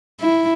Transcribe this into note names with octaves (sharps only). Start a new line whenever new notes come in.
E4